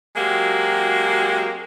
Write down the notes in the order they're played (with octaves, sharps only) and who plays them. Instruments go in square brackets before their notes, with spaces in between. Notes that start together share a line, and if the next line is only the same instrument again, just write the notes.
[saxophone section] F#3 G#3 A#3 C4 F#4 G4